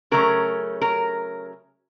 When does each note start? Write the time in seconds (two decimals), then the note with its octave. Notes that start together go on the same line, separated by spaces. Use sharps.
0.11 C#3 F#3 A3 C#4 A#4
0.82 A#4